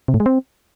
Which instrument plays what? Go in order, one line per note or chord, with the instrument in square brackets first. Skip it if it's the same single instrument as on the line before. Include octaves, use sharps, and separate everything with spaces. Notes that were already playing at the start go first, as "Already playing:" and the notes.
[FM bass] C3
A2
G#3
C4